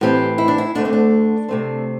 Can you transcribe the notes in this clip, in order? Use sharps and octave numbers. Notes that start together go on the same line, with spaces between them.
A2 E3 C4 G4
E4
D4
E4
D2 D3 A3 D4
C4
D4
C3 A3 C4